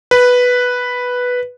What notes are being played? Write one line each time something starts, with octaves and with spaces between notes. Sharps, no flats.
B4